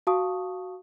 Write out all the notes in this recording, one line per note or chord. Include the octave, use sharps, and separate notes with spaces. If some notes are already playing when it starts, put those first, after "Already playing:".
F#4 F5 A5 C#6 D#6